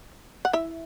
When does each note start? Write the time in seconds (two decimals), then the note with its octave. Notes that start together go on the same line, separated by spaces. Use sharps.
0.45 F#5
0.53 E4 E5